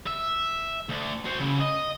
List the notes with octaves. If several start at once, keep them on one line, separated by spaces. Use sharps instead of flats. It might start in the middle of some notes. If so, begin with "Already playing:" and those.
E5
D2 D3
F#4 C5
C#3 E4
D#5